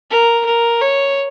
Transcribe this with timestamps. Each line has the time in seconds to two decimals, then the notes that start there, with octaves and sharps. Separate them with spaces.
0.11 A#4
0.46 A#4
0.81 C#5